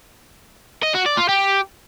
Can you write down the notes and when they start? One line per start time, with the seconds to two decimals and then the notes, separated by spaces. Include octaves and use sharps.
0.83 D#5
0.94 F#4
1.06 D5
1.17 F4
1.29 G4